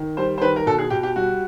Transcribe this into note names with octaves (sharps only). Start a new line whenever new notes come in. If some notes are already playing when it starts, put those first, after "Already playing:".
Already playing: D#3
G3 C5
C5
D#3 B4
A#4
B2 A4
G#4
B2 G4
G4
G3 F#4